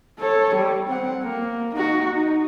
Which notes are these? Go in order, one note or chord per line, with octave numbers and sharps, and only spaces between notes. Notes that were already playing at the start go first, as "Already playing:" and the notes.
A4 C#5
G3
C4 F#5
A#3
D#4 F#4
D#4